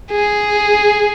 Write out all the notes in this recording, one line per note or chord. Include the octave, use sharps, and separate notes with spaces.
G#4